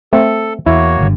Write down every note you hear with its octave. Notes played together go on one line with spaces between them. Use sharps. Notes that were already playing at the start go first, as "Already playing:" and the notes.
A3 C4 A4
E2 A#3 E4 F#4 C#5
F#1 G2 D3